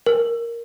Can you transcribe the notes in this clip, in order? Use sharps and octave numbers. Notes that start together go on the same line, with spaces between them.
A#4